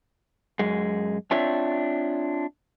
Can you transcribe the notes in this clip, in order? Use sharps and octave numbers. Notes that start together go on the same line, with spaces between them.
F#2 G#3
C4 D4 F4 C#5 E5